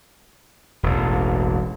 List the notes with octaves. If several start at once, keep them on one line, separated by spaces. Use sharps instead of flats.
E1 A1